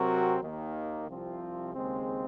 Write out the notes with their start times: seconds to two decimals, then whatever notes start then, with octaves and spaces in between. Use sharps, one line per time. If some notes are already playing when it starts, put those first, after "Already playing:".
Already playing: C3 F#3 C4 F#4 A#4
0.41 D#2 D#3 A#3
1.07 C2 C3 F3 C4 F4
1.74 D#2 C#3 G#3 C4